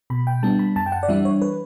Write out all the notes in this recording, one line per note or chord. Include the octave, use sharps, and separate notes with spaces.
B2 B5
G5
G3 B3 D4 A5
B5
F#2 A5
G5
F#5
D5
E3 G3 D4 E5
C#5
B4